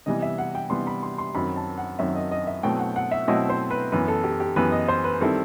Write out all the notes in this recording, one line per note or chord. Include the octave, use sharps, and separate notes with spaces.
C3 E3 G3 B3 D#5
E5
F#5
G5
C3 E3 G3 B3 C6
B5
C6
C6
F#2 D#3 F#3 C4 B5
A5
F#5
F#2 D#3 F#3 C4 E5
D#5
D#5
E5
B2 F#3 A3 C4 E4 G5
F#5
F#5
E5
B2 F#3 A3 C4 E4 D#5
C5
B4
F#2 E3 B3 B4
A4
G4
G4
F#2 E3 B3 B4
D#5
C5
B4
D#3 G3 C4 E4 A4